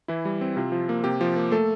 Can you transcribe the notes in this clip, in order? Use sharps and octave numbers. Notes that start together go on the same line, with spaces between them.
E3 E4
G3
C4
C3 F4
F3
A#3
C3 G4
F3
A#3
A3 A4